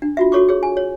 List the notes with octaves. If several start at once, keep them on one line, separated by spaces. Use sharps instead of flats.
D4
F4 F#4 E5
F#4 A4 C#5 C#6 D6
G#4 C#5
G#5
C#5